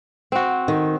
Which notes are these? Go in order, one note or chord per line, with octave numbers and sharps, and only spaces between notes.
C4 F#4
D#3